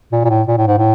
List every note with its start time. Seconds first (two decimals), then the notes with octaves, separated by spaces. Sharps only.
0.12 A#2
0.25 A#2
0.30 A2
0.47 A#2
0.58 A2
0.67 G#2
0.78 A2